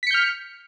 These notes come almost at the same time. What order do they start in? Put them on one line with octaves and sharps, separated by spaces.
B6 C#7 G6 F6